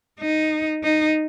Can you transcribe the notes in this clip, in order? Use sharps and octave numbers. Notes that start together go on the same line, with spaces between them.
D#4
D#4